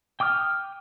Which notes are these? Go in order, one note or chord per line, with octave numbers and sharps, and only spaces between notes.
G5 D6 D#6 F6